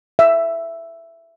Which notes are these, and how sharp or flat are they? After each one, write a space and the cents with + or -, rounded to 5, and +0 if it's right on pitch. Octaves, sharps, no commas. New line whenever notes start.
E5 +15